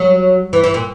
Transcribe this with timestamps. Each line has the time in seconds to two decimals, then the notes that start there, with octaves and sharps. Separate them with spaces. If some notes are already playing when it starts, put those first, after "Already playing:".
Already playing: F#3
0.53 E3
0.64 E3
0.74 A#2